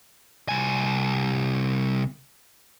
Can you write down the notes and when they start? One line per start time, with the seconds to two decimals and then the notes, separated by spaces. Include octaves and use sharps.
0.49 C2 G#5